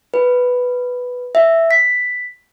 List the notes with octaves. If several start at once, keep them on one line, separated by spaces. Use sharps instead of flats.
B4
E5
B6